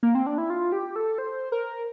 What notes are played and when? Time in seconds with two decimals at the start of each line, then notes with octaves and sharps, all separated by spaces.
0.03 A#3
0.15 C4
0.27 D4
0.38 E4
0.50 F4
0.72 G4
0.96 A4
1.18 C5
1.52 A#4